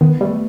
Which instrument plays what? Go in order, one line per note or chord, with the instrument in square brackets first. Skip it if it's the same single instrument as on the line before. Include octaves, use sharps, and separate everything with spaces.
[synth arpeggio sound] D#3 [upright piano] B3
[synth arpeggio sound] G3 [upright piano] A3